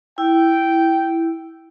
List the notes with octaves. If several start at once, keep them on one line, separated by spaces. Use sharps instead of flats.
E4 G5